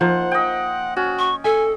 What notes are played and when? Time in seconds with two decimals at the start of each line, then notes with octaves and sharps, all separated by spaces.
0.01 F3 A#3 D#4 C5 F#5
0.32 D#5 G5
0.96 C#4 F#4
1.18 C#6
1.44 A4 E5 G#5